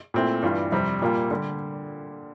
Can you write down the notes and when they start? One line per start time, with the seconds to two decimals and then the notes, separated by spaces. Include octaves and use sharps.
0.14 A#2 A3 C4 E4
0.42 G2 E3 G3 D4 F4
0.72 F2 C3 G3 C4
1.02 A#2 G3 A#3 F4
1.31 D3 G3